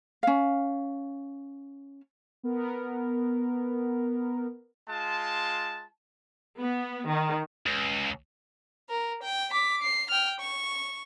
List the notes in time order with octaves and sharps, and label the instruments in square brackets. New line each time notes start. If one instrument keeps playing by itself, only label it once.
[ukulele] C#4 F5
[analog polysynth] B3 A#4
[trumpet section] G#3 F4 A5
[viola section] B3
D#3
[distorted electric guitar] C#2
[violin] A#4
G5
D6 B6
C7
G5 F6
C#6